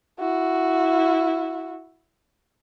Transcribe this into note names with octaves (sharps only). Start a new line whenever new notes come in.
E4 F#4